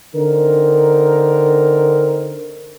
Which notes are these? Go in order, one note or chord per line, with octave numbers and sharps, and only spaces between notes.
D3 C4 D#4 A#4